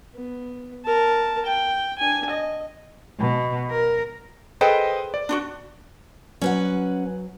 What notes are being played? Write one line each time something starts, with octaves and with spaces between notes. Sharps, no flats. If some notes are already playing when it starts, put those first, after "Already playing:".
B3
A#4 A5
G5
D4 G#5
D#5
B2
A#4
G#4 A4 B4 C5 D#5 G5
D5
D4 F4 F#4
F#3 C#4 B4 F#5